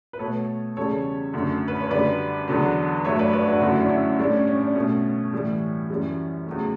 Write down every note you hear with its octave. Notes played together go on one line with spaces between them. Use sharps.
B4
B2 A3 A4 C#5
E2 C#3 G3 A4 C#5
F#2 D3 A3
B4
C#5
F#2 D3 G3 B4 D5
E2 D3 F#3
G2 F#3 A3 C#5 E5
B4 D5
B4 D5
D4 F#4
F#2 D3 F#3 A3 F#4
E4
D4
C#4 E4
A2 G3 D4
C#4
C#4
D4
B2 A3 C#4
A2 E3 G3
F#2 E3 G3
E2 C#3 F#3 A3